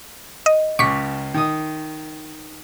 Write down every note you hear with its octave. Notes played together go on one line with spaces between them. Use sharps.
D#5
C#2 C#3 C#6 D6 B6
D#3 D#6